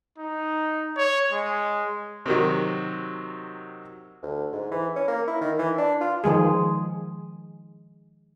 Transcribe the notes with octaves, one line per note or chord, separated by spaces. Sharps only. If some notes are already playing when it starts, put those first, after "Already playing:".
D#4
C#5
G#3
C3 D#3 F#3
D2
G#2
E3
C#4
A#3
E4
D#3
E3
D4
F4
D#3 F3 G#3 G#4